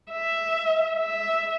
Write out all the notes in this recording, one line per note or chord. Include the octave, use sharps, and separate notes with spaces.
E5
E5